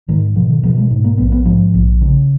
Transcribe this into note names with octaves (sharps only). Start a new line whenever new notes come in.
G#2 D#3
B2 F3
D#3
B2 F3
G#3
G#2
A#3
A#1 B3
B3
G#2 F3
A#1
C#3